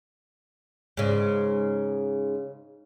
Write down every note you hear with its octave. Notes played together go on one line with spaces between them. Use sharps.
G#2 C#3